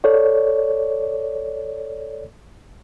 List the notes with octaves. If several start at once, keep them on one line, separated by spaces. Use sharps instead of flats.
A4 C#5 D5